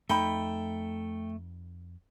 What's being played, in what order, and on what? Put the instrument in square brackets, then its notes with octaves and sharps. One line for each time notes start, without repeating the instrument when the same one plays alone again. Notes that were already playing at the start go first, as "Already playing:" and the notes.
[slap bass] F2 [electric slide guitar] A3 [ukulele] D#4 B5 [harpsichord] G5